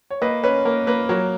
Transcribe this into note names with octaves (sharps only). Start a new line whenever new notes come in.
C#5
A#3 B4 D#5
C#4 B4
A#3 A#4
A#3 B4
F#3 A#4 C#5